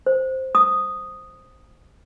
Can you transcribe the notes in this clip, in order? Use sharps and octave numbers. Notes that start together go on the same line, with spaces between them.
C5
D#6